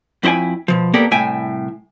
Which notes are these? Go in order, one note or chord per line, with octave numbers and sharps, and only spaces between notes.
F2 E4 C5 G5 G#5
B2 F3
A#3 B3 G4 A4 A#4 D5
C2 A2 E5 G5 G#5